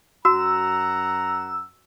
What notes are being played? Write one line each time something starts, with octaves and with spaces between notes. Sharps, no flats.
F#2 F#4 F#5 A#5 E6